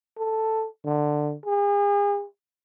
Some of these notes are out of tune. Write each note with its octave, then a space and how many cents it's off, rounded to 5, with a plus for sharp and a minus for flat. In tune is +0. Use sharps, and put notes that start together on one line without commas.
A4 +5
D3 +15
G#4 -40